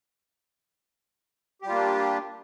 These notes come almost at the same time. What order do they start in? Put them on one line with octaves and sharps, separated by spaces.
G4 G3 F4 A#3 D4